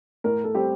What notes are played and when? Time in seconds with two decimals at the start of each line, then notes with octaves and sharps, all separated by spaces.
0.24 A2 A#4
0.44 A4
0.54 G3 C4 G4